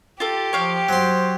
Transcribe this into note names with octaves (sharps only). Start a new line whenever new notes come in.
F4 G4 A4
F3 C#5 F5 G5
F#3 C5 C6